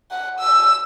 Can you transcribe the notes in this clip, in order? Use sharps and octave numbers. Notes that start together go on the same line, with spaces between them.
F#5
E6